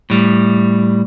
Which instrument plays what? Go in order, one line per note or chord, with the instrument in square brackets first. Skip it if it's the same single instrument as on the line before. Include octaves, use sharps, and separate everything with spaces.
[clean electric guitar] A2 G3